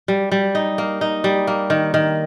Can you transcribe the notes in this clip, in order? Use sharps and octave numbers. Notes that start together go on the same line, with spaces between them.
G3
G3
D#4
A#3
D#4
G3
A#3
D#3
D#3